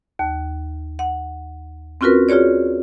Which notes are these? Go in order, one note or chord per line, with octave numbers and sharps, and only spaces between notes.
D#2
F#5
C4 C#4 F4 F#4 A#4 B4
F4 F#4 G#4 C#5 D5